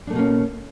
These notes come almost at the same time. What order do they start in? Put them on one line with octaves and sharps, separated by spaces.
D4 A3 B2 A#3 C#4